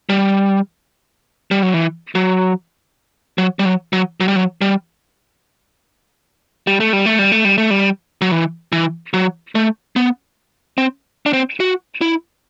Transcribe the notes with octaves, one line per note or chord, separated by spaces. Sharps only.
G3
G3
F#3
E3
F#3
F#3
G3
F#3
F#3
F#3
G3
F#3
G3
G3
A3
G3
A3
G3
A3
G3
A3
G3
F#3
E3
E3
F#3
A3
B3
C4
D4
C4
F#4
E4